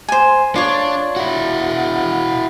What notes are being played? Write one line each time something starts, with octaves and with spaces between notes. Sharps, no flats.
C5 G#5
D4 F4 C#5
E4 F#4